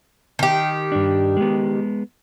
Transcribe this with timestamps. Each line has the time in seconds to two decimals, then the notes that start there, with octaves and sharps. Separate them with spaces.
0.39 D#3 G4
0.92 G2 D4
1.37 G#3 B3